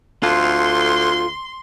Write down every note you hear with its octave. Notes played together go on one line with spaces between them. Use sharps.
D2 F4 A4 C6